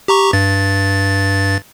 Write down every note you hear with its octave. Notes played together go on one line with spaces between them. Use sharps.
G4 A#5 C#6
G2 A6